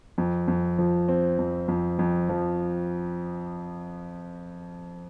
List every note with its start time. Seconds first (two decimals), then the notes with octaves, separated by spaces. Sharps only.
0.18 F2
0.48 F2
0.78 F3
1.08 C4
1.39 F2
1.68 F2
1.99 F2
2.29 F3